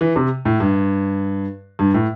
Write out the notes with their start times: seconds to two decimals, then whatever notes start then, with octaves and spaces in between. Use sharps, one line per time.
0.01 E3
0.16 C3
0.45 A2
0.60 G2
1.79 G2
1.94 A2